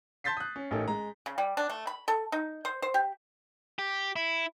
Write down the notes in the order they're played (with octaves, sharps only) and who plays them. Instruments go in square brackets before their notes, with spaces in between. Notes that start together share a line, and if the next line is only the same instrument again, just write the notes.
[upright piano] A5 C6 G6 A6 B6 C7
D#6 F#6
C#4
A1 C#4 D#4 A4 A#4
G#3 A#5
[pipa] C#3
G3
D4
A3
B5
A4
D#4
C5
C5
G4
[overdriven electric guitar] G4
E4